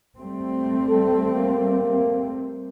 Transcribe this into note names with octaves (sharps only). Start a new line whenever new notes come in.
G3 A3 C4
A4
A#3